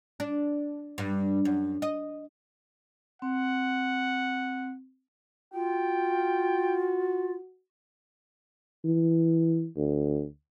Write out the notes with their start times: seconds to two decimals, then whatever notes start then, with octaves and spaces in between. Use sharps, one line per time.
0.20 D4
0.98 G2
1.45 F#2
1.82 D#5
3.22 C4 F#5
5.54 F4 F#4 G5
8.85 E3
9.76 D2